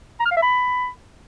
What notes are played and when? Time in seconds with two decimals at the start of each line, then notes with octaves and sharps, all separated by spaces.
0.20 A#5
0.25 F6
0.31 F5
0.37 E5
0.42 B5